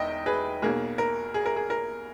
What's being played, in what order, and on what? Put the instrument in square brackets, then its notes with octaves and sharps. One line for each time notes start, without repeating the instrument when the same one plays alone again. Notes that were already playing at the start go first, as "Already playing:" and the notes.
Already playing: [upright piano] E1 E2 D#3 D#5 E5 G5
G#4 B4
B1 B2 A#3 G#4
A#4
G#4
A#4
G#4
A#4